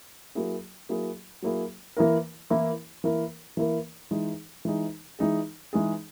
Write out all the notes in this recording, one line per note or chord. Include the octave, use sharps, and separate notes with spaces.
F#3 A#3 E4 G#4
F#3 A#3 E4 G#4
F#3 A#3 E4 G#4
E3 A#3 E4 A#4
E3 A#3 E4 A#4
E3 A#3 E4 A#4
E3 A#3 E4 A#4
E3 G#3 D#4 G#4
E3 G#3 D#4 G#4
E3 G#3 D#4 G#4
E3 G#3 D#4 G#4